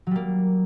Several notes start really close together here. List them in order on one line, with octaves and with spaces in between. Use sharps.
F#3 G3 A#3